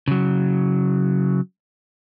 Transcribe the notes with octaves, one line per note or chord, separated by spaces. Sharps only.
C#3 F#3